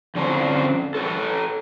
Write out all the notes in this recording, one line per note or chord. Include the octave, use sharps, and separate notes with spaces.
F2 D3 C#4 D4 A4 C5
A4 B4 C#5